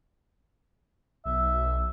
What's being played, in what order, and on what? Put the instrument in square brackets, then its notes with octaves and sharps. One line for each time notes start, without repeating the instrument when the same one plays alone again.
[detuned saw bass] B1 [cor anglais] E5